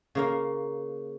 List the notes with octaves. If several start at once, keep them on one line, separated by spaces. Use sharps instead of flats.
C#3 A#3 F5